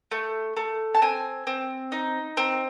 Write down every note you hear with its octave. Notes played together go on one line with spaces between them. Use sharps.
A3
A3
A5
C4 G#5
C4
D#4
C4